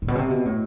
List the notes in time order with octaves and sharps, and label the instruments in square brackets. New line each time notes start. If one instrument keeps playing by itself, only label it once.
[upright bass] A2
B2
C3
B2
A2